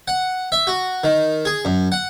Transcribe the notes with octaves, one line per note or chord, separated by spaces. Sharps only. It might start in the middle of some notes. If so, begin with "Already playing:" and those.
F#5
E5
F#4
D#3
G#4
F#2
F#5